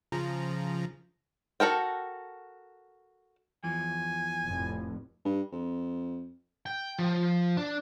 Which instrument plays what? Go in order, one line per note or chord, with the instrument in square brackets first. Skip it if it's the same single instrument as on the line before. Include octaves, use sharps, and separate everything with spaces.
[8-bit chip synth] C#3 F3 A#5
[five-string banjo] F#4 A4 A#4 G5
[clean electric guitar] E2 E3 F3 [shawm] G#5
[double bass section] F1 F2 A2
[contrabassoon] G2
F2
[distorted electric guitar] G5
F3
D4